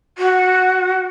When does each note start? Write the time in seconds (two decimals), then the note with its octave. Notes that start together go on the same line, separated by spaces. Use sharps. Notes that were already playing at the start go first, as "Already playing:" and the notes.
0.18 F#4